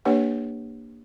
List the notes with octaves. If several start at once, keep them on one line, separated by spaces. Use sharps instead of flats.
A#3 D4 G4 B4 C#5 F#5